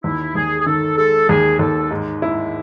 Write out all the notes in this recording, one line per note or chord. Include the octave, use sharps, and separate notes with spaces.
D#2 E4
D#2 G#4
G#4
D#3 A4
G#3 A4
D#2 G#4
D#2 A4
G#2
E4